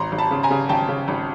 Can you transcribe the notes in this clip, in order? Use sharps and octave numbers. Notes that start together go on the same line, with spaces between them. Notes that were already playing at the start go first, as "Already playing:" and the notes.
Already playing: G#1 A#5 C6
G#1
A5 B5
C#3
G#5 A#5
C#3
G#1 G5 A5
C#3
G#1